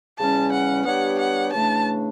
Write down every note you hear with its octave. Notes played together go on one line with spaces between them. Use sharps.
E2 C#3 G3 C#4 A5
F#5
G3 B3 D4 G4 C#5 F#5
F#5
C#3 E3 A3 D4 A5